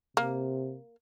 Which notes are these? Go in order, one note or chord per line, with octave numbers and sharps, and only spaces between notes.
C3 A#3